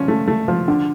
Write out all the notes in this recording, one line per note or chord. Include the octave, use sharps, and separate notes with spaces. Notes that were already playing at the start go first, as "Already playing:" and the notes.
Already playing: F3 C#4
A3
A3
F3
D3